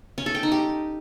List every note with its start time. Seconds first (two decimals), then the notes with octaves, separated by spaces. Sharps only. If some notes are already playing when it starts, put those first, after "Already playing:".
0.18 C#4
0.26 A4
0.35 G5
0.43 D#4
0.52 G4